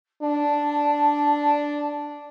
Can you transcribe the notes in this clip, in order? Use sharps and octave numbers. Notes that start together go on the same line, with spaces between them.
D4 A5